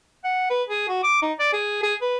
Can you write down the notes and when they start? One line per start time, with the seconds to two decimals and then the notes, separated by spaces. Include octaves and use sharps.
0.24 F#5
0.50 B4
0.69 G#4
0.88 F#4
1.03 D6
1.22 D#4
1.39 D5
1.53 G#4
1.83 G#4
2.01 B4